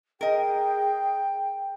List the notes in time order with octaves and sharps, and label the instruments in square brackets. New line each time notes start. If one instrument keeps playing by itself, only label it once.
[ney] G#4 [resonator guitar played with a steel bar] A#4 D#5 [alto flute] G5